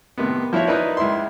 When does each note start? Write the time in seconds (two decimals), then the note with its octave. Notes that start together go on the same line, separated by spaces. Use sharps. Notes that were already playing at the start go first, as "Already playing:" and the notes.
0.18 A2 C3 D#3 B3
0.53 F3 E4 F#4 C#5 E5
0.67 D#4 E4 A#4 B4 D5
0.97 C#2 E4 E5 C6